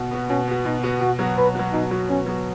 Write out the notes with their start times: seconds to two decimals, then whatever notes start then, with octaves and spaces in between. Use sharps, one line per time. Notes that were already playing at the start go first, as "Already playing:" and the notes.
Already playing: B2 B3 F#4
0.11 B3 F#4
0.30 B2 C#4
0.47 B3 F#4
0.65 B2 D#4
0.83 B3 F#4
1.01 B2 F#4
1.19 F#3 B3 F#4
1.37 B2 B4
1.55 F#3 B3 F#4
1.72 B2 D#4
1.91 F#3 B3 F#4
2.09 B2 C#4
2.26 F#3 B3 F#4